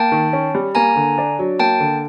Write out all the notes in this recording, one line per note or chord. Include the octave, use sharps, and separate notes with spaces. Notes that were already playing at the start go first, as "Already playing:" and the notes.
Already playing: A#3 G5 A5
D#3
C#4
G3
A#3 G#5 A#5
D3
D4
F#3
A#3 G5 A5
D3